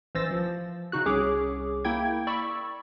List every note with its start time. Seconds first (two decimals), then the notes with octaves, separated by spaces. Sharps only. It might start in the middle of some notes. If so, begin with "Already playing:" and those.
0.15 A1 E3 C5 E6 A6 A#6
0.31 F3
0.92 C#3 D#4 F#4 F#6
1.06 C2 C#4 G#4 C#5 D6
1.85 A#3 E4 G5 G#6
2.27 D5 B5 C#6 E6